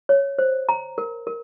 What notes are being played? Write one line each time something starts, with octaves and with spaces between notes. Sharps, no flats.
C#5
C5
A#5
A#4
A#4